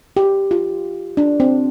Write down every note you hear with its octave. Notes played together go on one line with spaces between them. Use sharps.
G4
F4
D4
C4